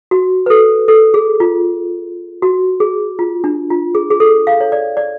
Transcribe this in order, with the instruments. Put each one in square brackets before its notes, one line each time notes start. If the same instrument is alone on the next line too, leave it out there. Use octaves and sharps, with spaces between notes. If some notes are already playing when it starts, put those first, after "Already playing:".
[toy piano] F#4
B4
A4
A4
G#4
F4
F#4
G#4
F4
D4
F4
G#4
G#4
A4
F5
C#5
D5
D5